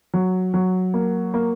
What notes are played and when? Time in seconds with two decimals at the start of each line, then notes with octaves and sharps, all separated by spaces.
0.14 F#3
0.54 F#3
0.94 A#3
1.34 A#3